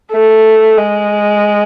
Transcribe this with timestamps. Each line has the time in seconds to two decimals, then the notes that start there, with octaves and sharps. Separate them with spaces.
0.12 A3
0.77 G#3